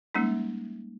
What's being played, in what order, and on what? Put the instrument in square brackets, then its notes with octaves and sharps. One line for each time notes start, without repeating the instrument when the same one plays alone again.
[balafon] G3 G#3 A#3 C#4 D#4